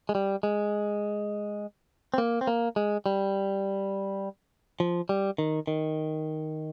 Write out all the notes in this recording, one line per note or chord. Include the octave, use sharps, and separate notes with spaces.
G#3
G3
G#3
C4
A#3
C4
A#3
G#3
G3
F3
G3
D#3
D#3